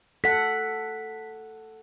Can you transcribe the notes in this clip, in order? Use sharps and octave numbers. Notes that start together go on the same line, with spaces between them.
A4 F#5 B6